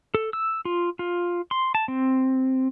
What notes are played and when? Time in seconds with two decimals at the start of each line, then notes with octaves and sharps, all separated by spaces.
0.15 A4
0.33 E6
0.65 F4
0.99 F4
1.51 C6
1.75 A5
1.88 C4